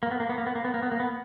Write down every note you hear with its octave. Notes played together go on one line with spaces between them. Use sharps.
A#3
B3
A#3
B3
A#3
B3
A#3
B3
A#3
B3
A#3
B3